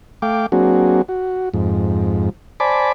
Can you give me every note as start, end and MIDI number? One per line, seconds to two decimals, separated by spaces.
0.22 0.46 57
0.22 0.46 77
0.22 0.46 79
0.22 0.46 86
0.52 1.02 54
0.52 1.02 58
0.52 1.02 60
0.52 1.02 62
0.52 1.02 66
0.52 1.02 68
1.09 1.49 66
1.54 2.30 41
1.54 2.30 44
2.60 2.92 72
2.60 2.92 74
2.60 2.92 80
2.60 2.92 81
2.60 2.92 83
2.60 2.92 86